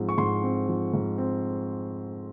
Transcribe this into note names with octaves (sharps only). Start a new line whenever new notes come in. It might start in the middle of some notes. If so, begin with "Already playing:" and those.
Already playing: G#2 F3 C4
C#6
G#2 C6
C4
F3
G#2
C4